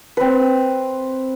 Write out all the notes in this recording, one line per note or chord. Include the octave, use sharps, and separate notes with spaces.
C4 B4